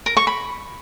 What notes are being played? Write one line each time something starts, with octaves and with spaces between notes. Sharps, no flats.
A#4
C#6
B5